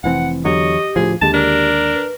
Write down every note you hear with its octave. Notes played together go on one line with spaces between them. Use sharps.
F1 E3 C4 F#5
E2 D3 F#3 G4 C#5 D#5
D2 A2 F3 G#4
D#2 D3 G#3 G4 A5
D4 A#4
B4